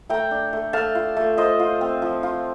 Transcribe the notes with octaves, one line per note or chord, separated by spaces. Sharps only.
A3 G5 A#5
D4
A3
A3 F5 A5
F4
A3
F4 C5 D#5
F4
C4
F3
F4